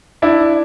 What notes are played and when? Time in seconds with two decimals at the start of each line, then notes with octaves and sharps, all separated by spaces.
0.22 D4 E4